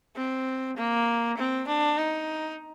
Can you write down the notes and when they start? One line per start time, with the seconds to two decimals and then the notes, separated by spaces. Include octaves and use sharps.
0.16 C4
0.77 A#3
1.37 C4
1.68 D4
1.97 D#4